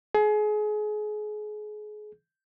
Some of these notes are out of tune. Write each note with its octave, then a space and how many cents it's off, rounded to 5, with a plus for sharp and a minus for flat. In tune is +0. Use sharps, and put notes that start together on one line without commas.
G#4 +30